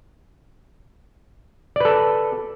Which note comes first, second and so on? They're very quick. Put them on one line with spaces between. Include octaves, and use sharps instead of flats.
D5 B4 A4